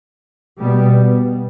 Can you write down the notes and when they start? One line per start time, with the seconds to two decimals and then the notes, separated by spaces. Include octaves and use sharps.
0.59 B2 G3 B3